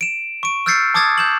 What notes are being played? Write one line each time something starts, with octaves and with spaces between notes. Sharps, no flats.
D7 E7
C#6 D7
E6 F6 G6 A6 C7 C#7
A5 D6 D#6 G#6 A6
G6 E7 F#7